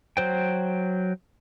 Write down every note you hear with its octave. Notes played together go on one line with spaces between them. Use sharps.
F#3 C5 G5